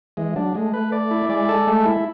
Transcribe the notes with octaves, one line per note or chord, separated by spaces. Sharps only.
E3 G#3
F#3 D4
G#3 A3
B4
D5
E4
G#3 D5
A4
A3
E4